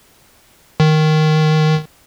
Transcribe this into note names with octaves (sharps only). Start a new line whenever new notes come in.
D#3